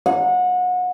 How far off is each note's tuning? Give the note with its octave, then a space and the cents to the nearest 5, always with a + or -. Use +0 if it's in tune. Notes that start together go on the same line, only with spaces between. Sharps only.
F#5 -30